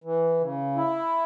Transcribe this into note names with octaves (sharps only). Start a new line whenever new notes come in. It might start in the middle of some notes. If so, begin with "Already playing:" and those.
E3
C#3
E4